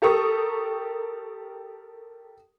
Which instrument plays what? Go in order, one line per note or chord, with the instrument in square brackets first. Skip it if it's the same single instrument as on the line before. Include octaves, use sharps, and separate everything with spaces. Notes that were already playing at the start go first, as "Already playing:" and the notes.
[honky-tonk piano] G4 A4 A#4 C#6 D#6